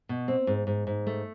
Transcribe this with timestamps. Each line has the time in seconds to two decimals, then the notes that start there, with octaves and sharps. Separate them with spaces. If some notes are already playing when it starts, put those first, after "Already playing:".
0.09 B2
0.28 C4
0.47 G#2
0.67 G#2
0.87 G#2
1.07 A3